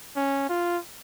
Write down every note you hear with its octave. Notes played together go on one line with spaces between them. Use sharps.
C#4
F4